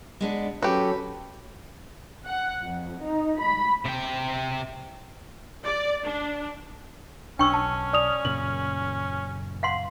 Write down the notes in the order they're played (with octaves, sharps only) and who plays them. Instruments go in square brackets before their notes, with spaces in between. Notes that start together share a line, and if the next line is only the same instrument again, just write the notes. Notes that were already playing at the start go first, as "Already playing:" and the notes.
[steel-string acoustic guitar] G#3 B3 D4
[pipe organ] F#3 C#4 A4 [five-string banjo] F#4 G4 [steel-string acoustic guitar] B4
[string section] F#5
F2
D#4
B5
[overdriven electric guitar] C3 G5
[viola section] D5
D4
[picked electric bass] B1 [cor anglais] C#4 [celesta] D4 [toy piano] G5 C#6 E6
[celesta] A5
D5 D#6 F7
[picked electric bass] F#2 A#2 C#3 [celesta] F#7
[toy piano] F5 F#5 C6